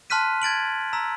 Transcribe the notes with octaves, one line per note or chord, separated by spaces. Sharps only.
A5 C6 F6 F#6 B6 D#7
G#6 A6 D7 F#7
A#5 E6 B6